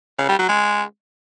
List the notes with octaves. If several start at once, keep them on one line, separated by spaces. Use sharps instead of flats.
C#3
G3
F#3
G#3